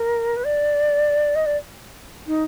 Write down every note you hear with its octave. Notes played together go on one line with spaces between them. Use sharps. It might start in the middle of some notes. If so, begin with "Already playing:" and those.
Already playing: A#4
B4
D5
D#5
D5
D#4